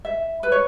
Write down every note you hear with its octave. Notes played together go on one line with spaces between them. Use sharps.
E5
B4
C#5